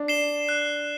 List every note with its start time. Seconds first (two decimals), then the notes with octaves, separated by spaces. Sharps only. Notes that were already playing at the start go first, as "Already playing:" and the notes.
Already playing: D4
0.08 C7 E7 G7
0.49 F#6